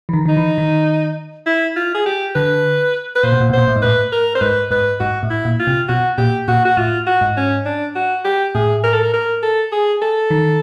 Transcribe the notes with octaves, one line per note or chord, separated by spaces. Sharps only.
E3
D#3
D#3 D#4
E3
D#3
E4
F4
G#4
G4
D3 B4
B4
A#2 C5
B2
A#2
B2
A#2 C5
A2
G#2
A2 B4
A#4
C5
G#2 B4
G#2 B4
G#2 F#4
A2
E4
A#2
F4
C3
B2 F#4
A#2 G4
A#2 F#4
F#4
A2 F4
F#4
G#2
C#4
D4
F#4
G4
A2 G#4
A#4
A4
A#4
A#4
A4
G#4
A4
D#3